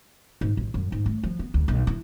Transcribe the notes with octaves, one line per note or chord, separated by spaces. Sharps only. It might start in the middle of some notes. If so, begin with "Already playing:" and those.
G#2
A1
F#2
G#2
A3
F3
B3
D2
B1
E4